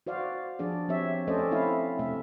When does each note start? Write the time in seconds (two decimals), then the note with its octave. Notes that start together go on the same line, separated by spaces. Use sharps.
0.07 F#4 C5 D5 F5
0.59 F3 D4 G#4 D5
0.89 F3 C4 G4 C#5 E5
1.27 A3 C#4 A4 C5 D5 D#5
1.50 A3 C4 E4 F5
1.99 C3 A3 E5